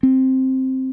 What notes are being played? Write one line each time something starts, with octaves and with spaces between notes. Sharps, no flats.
C4